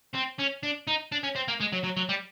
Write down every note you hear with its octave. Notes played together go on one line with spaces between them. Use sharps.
C4
C#4
D4
D#4
D4
C#4
C4
A#3
G#3
F#3
F#3
F#3
G3